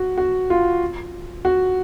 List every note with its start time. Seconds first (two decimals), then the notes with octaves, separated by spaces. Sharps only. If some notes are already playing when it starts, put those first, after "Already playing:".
Already playing: F#4
0.18 F#4
0.50 F4
1.45 F#4